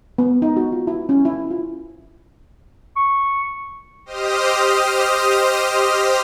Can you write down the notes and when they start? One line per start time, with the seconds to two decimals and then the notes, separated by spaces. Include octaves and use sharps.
0.18 B3
0.42 D#4
0.57 F#4
0.72 F4
0.87 E4
1.09 C#4
1.25 E4
1.51 F4
2.97 C#6
4.05 G4 C5 D#5 D#6 F6